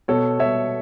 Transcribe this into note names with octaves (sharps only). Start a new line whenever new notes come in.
B2 A4 C#5
B2 C#5 E5